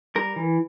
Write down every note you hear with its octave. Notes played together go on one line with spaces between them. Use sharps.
G3 A#4
E3